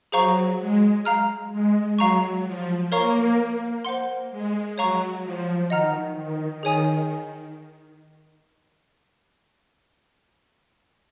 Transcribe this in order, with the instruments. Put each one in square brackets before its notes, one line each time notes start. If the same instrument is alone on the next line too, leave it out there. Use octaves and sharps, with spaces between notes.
[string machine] F#3 [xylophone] G#4 C5 F5 A#5 C#6
[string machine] G#3
[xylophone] F5 A#5 F6
[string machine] G#3
[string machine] F#3 [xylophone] F5 A#5 C#6
[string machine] F3
[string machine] A#3 [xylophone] A#4 C#5 F5 A#5 C#6
[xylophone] C5 F#5 C6
[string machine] G#3
[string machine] F#3 [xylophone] C#5 F5 A#5 C#6
[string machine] F3
[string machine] D#3 [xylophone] D#5 F#5 A#5 F6
[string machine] D#3
[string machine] D#3 [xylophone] G#4 C#5 G#5 D#6